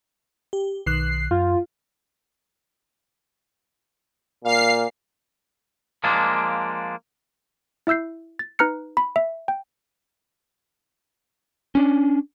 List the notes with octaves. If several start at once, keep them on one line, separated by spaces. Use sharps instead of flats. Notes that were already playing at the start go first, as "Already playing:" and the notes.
G4
B1 D#3 F#6 C7
F#2 F4
A#2 F5 C7
F3 G#3 A#3 D4
E4 E5 E6 G6 C7
A6
D#4 B4 A#5 F6 F#6 C#7
B5
E5
G5
C#4 D4